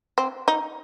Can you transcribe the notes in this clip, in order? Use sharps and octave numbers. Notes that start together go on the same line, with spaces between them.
C4
D#4